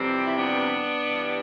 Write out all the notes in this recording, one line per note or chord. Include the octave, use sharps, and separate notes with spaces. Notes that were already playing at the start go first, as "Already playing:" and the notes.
Already playing: F2 C3 E3 G3 C4
E4
B3 D4
G2 E3 G3